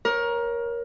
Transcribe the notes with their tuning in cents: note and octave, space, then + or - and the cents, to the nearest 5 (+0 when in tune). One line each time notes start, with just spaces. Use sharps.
A#4 +20 C#5 +0